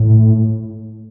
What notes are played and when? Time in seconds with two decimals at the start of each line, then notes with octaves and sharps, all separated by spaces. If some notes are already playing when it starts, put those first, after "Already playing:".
Already playing: A2